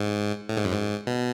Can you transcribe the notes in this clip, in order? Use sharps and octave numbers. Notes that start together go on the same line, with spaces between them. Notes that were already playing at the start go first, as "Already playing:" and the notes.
Already playing: G#2
A2
G#2
F#2
G#2
B2